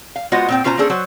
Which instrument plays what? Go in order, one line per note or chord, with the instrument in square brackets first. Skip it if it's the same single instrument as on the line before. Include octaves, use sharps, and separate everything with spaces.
[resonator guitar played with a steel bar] F5
G#3 B3 F4 F#4 C5 D#5
A#2 C4 G5
B2 C#4 F4 C5 G5 A#5
A#3 C#4 D4 G#4 A4 C5
F#3 F#4 C5